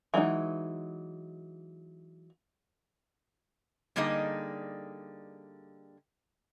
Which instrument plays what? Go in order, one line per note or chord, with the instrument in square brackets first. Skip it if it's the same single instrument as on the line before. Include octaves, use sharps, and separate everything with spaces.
[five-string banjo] E3 F#3 G#3 D#4
[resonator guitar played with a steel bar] D3 G3 A#3 D#4 G#4 D#5